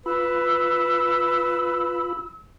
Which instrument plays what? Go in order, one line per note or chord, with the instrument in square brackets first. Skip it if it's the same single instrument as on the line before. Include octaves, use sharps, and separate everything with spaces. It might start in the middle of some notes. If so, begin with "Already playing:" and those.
[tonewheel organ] F4 B5 [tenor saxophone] B4 [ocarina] E6